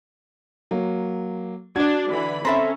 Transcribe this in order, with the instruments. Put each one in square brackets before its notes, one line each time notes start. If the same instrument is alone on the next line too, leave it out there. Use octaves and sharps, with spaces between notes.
[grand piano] F#3 A#3
[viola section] D4 [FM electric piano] F#4 [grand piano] D5 G#6
[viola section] D3 E3 B5
[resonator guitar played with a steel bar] C4 A4 E5 [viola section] C#4 [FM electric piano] A#5 B5